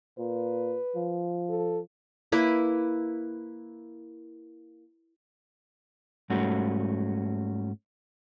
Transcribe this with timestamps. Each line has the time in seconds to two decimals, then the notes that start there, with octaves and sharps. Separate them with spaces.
0.19 A#2 B4
0.95 F3
1.49 A4
2.32 A#3 E4 B4
6.30 G#2 G3 A3 C#4 F#4